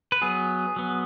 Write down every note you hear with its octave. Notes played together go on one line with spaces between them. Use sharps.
B4
F#3 B3 G#4
F#3 B3